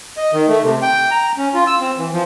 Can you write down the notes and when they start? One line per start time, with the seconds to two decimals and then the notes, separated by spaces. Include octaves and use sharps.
0.17 D#5
0.33 D#3
0.48 A3
0.62 C3
0.82 G5
1.11 A#5
1.38 C#4
1.54 F4
1.67 E6
1.80 C4
1.97 E3
2.12 F3